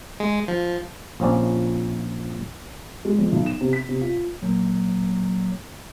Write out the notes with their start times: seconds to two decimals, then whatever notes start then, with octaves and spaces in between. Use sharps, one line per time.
0.20 G#3
0.48 F3
1.20 A#1 F3 C4 C#4 D5
3.05 G#3
3.18 F2
3.32 B1
3.46 E7
3.61 C3
3.73 B6
3.89 C3
4.01 F4
4.42 A#2 F#3 A#3